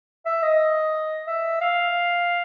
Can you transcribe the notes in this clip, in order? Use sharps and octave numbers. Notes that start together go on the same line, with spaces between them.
E5
D#5
E5
F5